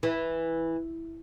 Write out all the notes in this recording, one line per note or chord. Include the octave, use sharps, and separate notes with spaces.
E3